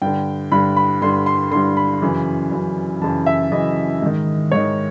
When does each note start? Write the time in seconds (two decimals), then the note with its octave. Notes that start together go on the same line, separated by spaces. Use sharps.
0.02 G2 D3 G5
0.52 G2 D3 B5
0.76 B5
1.02 G2 D3 C6
1.26 C6
1.51 G2 D3 C6
1.77 B5
2.02 F#2 C#3 E3
2.52 F#2 C#3 E3
3.02 F#2 C#3 E3 A5
3.26 E5
3.52 F#2 C#3 E3 D#5
4.01 G#2 D#3
4.51 G#2 D#3 C#5